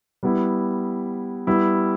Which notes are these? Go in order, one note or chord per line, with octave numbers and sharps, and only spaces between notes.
G3 B3 E4
G3 B3 E4